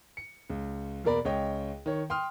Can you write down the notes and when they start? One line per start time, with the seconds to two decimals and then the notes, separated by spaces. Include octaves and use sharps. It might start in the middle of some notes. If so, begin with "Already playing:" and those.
0.17 C#7
0.50 C#2
1.04 E2 B2 A#3 A#4 D5 B5
1.25 C#2 C#5 D#5 G5
1.86 D#3 C#5
2.10 G5 C6 D#6 F6